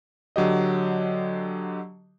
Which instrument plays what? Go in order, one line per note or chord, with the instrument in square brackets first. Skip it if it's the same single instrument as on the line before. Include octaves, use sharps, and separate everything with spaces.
[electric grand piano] D3 F#3 G4 D#5